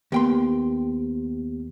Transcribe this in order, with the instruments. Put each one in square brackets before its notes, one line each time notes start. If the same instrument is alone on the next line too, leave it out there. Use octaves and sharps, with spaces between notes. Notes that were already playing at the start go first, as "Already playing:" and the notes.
[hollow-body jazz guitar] D#2 G5 C6 [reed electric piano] A#3 B3 G4